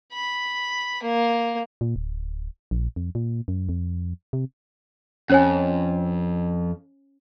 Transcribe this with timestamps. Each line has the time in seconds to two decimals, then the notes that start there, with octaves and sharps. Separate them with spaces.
0.13 B5
1.03 A#3
1.81 A#2
1.96 D1
2.71 A#1
2.96 F2
3.15 A#2
3.48 F#2
3.69 F2
4.33 C3
5.30 F2 C#4 C#5 G#5